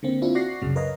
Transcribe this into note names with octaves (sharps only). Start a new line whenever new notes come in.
D3 A#3 C4
C4 D4 E4 F4
F#4 D5 C#6 F#6 A#6 C7
C2 F#2 C#3 F#3
A#4 B4 C#5 D#5 F5 A#5